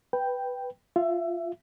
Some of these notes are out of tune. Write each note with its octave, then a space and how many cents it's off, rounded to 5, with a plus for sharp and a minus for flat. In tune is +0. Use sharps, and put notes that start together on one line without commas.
B4 +0 G5 +0
F4 +0 E5 +20